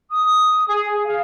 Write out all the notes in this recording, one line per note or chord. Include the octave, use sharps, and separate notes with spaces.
D#6
G#4
F5